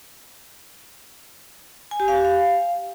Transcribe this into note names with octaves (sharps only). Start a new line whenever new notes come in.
G#5
G4
F5
G4
F5